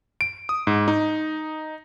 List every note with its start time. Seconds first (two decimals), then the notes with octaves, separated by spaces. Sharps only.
0.21 D7
0.49 D#6
0.67 G#2
0.88 D#4